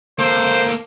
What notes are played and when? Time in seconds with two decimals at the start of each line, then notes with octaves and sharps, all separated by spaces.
0.19 A#3 A4 C5